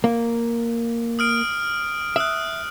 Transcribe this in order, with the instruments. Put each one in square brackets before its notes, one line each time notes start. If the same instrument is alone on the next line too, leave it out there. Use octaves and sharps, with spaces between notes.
[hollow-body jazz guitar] A#3
[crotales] D#6 F6 D7
[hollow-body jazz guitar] E5 [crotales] D#6 F#6